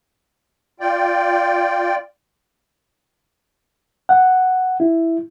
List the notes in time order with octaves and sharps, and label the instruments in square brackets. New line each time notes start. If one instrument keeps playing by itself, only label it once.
[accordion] F4 D5 G5
[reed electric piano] F#5
E4